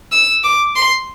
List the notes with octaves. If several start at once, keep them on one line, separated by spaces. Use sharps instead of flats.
E6
D6
C6